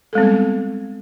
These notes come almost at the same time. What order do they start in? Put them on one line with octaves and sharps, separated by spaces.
A4 G#3 C4 G3 B3